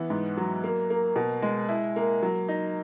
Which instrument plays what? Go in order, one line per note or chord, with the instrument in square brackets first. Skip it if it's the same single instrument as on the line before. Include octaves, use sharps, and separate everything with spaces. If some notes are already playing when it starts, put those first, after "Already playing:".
Already playing: [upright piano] E3 B3
G#2
F#3
A#3
A#3
B2
G#3
E4
A#3
F#3
D#4